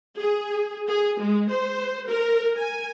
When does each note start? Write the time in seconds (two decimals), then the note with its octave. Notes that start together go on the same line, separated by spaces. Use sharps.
0.18 G#4
0.88 G#4
1.21 G#3
1.50 C5
2.09 A#4
2.57 G#5